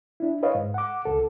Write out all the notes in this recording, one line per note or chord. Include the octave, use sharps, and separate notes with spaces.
D4 E4
B4 C#5 D#5 F5
G#2
F#5 D6
C#2 A4